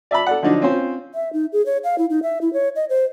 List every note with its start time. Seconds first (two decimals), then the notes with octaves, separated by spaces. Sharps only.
0.11 D5 E5 A5 B5
0.27 A4 D5 F#5
0.43 D3 F3 F#3 D4 D#4
0.62 C4 C#4 F4 C5
1.15 E5
1.33 D#4
1.53 G#4
1.66 C#5
1.84 F5
1.98 E4
2.10 D#4
2.23 E5
2.41 E4
2.53 C#5
2.76 D#5
2.89 C5